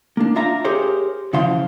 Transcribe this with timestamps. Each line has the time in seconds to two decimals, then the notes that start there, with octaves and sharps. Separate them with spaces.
0.17 A#3 D4
0.36 D4 F4 E5 F5 A#5
0.65 G4 G#4 A#4 C5 C#5
1.33 C#3 E3 F3 F5 C6